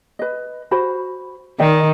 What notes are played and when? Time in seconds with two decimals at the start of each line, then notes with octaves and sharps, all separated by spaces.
0.19 B4 D#5
0.71 F#4 C5 B5
1.60 D#3 D5 D#5 G5